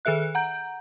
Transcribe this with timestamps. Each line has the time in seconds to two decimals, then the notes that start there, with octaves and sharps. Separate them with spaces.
0.05 D#3 G#4 A4 E5 F#6
0.35 F#5 A#5 G6